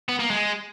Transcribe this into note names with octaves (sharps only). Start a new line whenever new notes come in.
B3
A#3
G#3